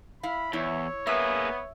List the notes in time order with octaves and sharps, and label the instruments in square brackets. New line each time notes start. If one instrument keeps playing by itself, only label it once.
[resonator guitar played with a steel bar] E4 F5 [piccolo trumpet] B5
[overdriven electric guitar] E2 [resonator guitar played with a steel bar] E4 [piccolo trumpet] C#5
[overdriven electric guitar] A#3 G#4 [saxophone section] B3 [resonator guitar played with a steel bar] E5